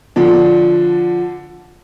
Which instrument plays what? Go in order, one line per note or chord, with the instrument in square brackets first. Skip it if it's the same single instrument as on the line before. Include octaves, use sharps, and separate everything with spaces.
[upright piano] D3 F3 D4